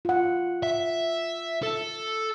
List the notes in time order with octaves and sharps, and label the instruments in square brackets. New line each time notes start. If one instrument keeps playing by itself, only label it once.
[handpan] F4 F#5
[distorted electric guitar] E5
A4